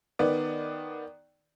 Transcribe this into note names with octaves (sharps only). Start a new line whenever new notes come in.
D#3 B3 D5